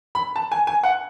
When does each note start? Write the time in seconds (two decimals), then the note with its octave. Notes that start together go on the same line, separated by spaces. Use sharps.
0.15 B5
0.36 A5
0.52 G#5
0.67 G#5
0.83 F#5